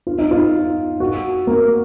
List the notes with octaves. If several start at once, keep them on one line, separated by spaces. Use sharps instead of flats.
F4
D#4
F4
F#4
A#3